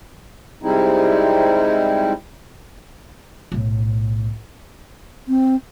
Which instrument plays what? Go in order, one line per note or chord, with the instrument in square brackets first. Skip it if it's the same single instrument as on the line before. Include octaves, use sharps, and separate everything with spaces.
[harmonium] C3 G3 G#3 C4 D#4 E4
[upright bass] B1 A2
[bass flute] C4